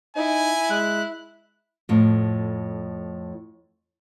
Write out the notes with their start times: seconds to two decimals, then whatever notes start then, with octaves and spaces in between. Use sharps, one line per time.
0.16 D#4 E4 G#5
0.70 G#3 F#6
1.89 F2 A2